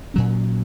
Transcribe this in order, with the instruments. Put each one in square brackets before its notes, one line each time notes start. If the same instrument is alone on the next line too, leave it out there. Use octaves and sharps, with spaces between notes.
[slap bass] A#2 F#3 C#4